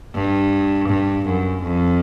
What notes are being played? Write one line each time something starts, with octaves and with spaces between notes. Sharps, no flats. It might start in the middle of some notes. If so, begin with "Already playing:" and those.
G2
G2
F#2
F2